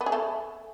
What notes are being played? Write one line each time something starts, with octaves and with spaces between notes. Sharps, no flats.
B3
G#4
A3